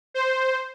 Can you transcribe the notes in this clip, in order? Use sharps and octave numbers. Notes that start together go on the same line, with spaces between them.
C5